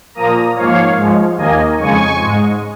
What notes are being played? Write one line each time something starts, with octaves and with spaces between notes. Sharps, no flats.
A#2 F3 A#3 A#5 D#6
G#2 F3 A#3 C#5 F5
G#2 F3 G#3
D#2 D#3 A#3 D#5 G#5
F2 C#3 G#3 G#5 C#6
G#2 G#3